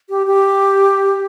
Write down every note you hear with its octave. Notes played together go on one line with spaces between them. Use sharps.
G4
G4